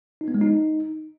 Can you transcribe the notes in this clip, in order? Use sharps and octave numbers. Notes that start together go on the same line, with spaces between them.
D#4
B3
G#3
D#4